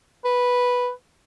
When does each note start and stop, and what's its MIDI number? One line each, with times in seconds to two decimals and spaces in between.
0.25 0.90 71